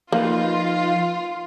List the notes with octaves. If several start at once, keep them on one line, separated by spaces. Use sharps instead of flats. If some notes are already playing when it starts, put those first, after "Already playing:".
F3 A#3 D#4 F4 B4